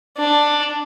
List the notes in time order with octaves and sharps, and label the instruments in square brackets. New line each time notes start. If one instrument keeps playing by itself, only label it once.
[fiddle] D4